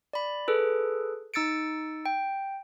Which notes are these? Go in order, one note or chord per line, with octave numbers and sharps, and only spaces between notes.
D5 B5
G#4 A4 B4
D#4 E6 A6 C#7 D7
G5